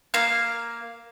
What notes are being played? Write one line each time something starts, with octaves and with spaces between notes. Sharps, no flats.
A#3 F5